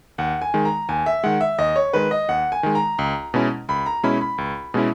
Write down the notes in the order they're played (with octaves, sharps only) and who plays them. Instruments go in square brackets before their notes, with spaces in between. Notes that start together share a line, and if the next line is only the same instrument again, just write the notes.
[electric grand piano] D#2 [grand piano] F#5
[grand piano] G#5
[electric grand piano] D#3 G#3
[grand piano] A#5
[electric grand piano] D#2 [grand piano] G#5
[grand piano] E5
[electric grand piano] D#3 G#3 [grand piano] F#5
[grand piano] E5
[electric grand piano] D#2 [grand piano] D#5
[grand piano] C#5
[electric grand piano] D#3 G#3 [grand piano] B4
[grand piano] D#5
[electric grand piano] D#2 [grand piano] F#5
[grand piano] G#5
[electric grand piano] D#3 G#3
[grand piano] A#5
[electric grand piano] C#2
B2 G#3 C#4 E4
[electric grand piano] C#2 [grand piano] B5
[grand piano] A#5
[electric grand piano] B2 G#3 C#4 E4 [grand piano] B5
[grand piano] B5
[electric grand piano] C#2
B2 G#3 C#4 E4